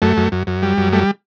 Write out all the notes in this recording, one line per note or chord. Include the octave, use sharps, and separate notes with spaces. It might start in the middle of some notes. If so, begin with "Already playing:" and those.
F#2 A3
F#2
F#2
F#2
G3
F#2
G3 A3